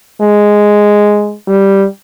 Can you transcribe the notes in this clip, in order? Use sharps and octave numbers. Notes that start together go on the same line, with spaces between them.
G#3
G3